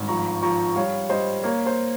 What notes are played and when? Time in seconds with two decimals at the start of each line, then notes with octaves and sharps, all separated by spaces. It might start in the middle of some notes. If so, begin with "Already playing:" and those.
Already playing: G#1 G2
0.08 F3 A#5 C#6
0.42 F3 A#5 C#6
0.76 G3 C#5 F5
1.10 G3 C5 D#5
1.43 A#3 C#5
1.66 C5